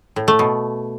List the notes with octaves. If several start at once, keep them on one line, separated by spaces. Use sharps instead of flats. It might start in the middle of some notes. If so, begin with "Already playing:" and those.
A2
A3
B2